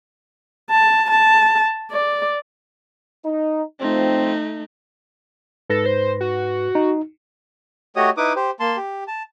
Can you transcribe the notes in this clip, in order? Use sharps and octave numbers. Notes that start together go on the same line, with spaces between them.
A5
A5
D5
D#4
F3 A3 C4 D#4
G#2 A4 B4 A#6
C5
F#4
D#4
A3 F#4 G4 C#5 D#5 D#6
D#4 E4 B4 D6 D#6
G4 C5
A#3 A5 C6
G4
A5